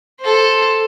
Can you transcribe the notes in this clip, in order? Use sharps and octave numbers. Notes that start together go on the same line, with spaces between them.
A4 C5